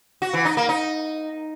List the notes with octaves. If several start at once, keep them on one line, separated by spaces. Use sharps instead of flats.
F#4
E3
D#4
A#3
D#4